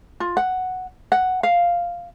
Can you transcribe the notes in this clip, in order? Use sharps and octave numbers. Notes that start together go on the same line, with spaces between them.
F4
F#5
F#5
F5